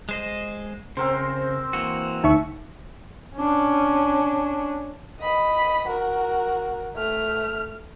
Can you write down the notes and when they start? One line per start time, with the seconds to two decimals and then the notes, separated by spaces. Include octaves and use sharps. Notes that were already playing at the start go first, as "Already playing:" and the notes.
0.09 G#3 C5 D#5
0.97 C#3 C4 A#4 C5
1.73 E3 A#3 F#4
2.24 D2 D#4 E5 C#6
3.36 C#4 D4
5.21 D#5 B5
5.88 F#4 A#4
6.95 A3 F6